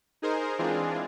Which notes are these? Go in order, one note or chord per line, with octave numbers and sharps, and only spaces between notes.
D#4 G#4 A#4 C5
E3 G#3 C4 D4 F4 G#4